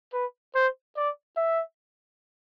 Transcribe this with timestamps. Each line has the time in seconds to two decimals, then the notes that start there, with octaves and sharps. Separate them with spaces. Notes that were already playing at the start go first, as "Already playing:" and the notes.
0.13 B4
0.54 C5
0.96 D5
1.37 E5